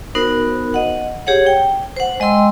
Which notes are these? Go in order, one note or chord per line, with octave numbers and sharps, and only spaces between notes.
B3 D#4 F#4 A#4 C5
D#5 F#5
G4 G#4 C#5 F#5
G5
C5 F#5
G#3 D#5 G5 C6 E6